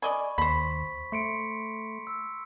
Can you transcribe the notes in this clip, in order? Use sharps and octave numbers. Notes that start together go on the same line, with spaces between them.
D5 D#5 G#5 B5 C#6
D#2 C5 B5 B6
A3 C6 C#7 D7
E6